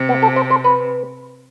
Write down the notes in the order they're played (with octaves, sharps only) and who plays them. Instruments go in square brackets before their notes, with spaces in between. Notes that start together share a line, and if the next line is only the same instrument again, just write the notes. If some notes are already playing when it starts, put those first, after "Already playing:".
Already playing: [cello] C3
[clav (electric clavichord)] B3
A4
C5
C5
B4